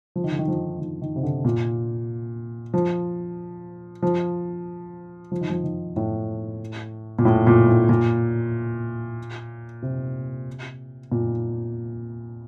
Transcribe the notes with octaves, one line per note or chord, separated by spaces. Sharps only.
F3
D#3
D3
D#3
F3
D#3
D#3
C3
D3
A#2
F3
F3
F3
D#3
F3
D#3
A2
A#2
A2
A#2
A2
A#2
C3
A#2